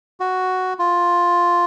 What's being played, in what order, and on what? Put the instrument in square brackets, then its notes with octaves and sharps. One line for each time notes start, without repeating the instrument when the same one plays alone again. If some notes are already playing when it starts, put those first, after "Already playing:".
[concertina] F#4
F4